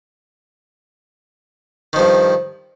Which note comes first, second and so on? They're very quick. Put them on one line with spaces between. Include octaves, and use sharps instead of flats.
D#3 F3 G2